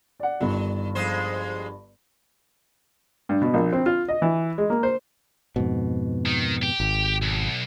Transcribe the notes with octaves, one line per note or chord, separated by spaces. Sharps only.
D5 F#5
G1 G2 D#3
F2 G#3 C5
G2
B2
A#1
C4
F4
D#5
E3
G#3
A#3
C5
F2 G#2 B2
D#3
G4
G#1
B1